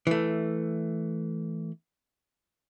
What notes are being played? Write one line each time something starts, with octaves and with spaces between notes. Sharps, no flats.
E3 A3